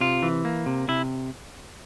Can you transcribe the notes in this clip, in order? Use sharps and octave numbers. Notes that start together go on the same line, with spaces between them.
C3 F4
E3
A#3
C3
C3 E4